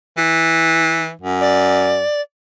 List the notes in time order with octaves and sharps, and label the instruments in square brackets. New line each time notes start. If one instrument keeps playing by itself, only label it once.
[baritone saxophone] E3
F#2
[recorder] D5